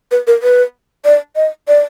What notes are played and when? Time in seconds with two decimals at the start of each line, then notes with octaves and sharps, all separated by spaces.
0.11 B4
0.27 A#4
0.43 B4
1.05 D5
1.36 D#5
1.68 D5